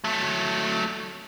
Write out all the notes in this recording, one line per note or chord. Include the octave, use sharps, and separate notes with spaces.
F#3 A3